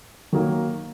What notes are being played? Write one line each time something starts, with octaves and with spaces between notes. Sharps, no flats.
D#3 F#3 A#3